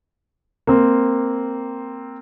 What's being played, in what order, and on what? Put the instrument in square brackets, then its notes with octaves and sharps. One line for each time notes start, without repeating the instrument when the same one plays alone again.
[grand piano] A#3 C4